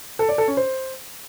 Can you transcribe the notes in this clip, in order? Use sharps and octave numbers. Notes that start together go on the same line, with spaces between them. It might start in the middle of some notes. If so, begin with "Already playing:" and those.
A4
D5
A4
C#4
C5